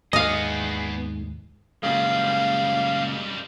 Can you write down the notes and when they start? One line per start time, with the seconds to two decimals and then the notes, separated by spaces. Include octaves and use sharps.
0.13 D#2 G#2 B3 G#4 D#5 F5
1.83 F#2 A#2 C#3 G3 G#3 F5